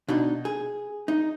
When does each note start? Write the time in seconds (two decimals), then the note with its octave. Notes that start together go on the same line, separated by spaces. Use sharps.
0.08 B2 D4 D#4
0.45 G#4
1.08 D#4